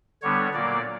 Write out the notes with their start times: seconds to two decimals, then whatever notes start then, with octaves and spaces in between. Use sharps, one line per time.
0.22 D3 G3 B3 D4 C#5
0.54 A#2 F#3 A#3 D5